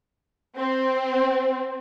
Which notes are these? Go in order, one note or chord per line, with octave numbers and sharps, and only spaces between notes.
C4